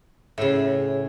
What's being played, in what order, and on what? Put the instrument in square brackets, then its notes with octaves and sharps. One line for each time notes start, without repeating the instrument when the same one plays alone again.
[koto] A2 C#3 [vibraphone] G#4 E5